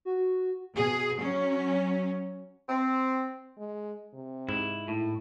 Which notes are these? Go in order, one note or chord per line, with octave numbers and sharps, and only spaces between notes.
F#4
B2 G#4
F#3 C#4
C4
G#3
C3
G#2 E4
A2 E4